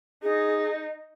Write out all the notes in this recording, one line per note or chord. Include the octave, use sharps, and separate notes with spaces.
D#4 G#4